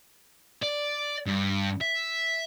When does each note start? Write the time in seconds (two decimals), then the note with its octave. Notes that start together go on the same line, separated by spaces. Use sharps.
0.62 D5
1.26 G2
1.81 E5